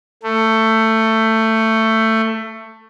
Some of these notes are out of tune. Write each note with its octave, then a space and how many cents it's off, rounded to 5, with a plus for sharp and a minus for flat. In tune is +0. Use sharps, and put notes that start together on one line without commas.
A3 +15